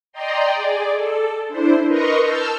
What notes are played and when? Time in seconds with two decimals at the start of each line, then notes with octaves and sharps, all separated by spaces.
0.12 D5 D#5 G5 A#5 C6
0.54 G#4 D5
0.94 A4
1.49 D4 E4 C5
1.87 A#4 B4 D#5 A#5 C6 C#6
2.21 A5 E6 F6 G6